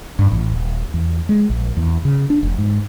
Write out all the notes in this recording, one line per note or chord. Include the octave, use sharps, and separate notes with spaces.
G2
A1
D#1
E2
G#3
A#1
E2
C#3
D4
F1
G#2